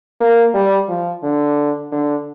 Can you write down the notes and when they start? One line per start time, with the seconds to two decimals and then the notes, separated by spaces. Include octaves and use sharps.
0.20 A#3
0.54 G3
0.89 F3
1.23 D3
1.92 D3